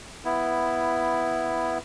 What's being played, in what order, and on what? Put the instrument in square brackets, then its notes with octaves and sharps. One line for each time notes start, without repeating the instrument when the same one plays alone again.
[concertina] B3 E4